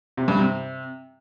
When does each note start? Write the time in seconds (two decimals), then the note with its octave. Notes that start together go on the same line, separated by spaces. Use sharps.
0.17 C3
0.28 G2
0.38 C3